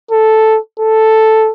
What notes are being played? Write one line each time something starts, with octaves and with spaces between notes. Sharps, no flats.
A4
A4